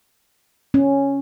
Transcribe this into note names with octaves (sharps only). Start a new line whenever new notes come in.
C#4